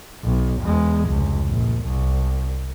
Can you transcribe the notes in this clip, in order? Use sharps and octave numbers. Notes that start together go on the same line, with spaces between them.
B1
E2 G#3
F1 C#2
A#1
C2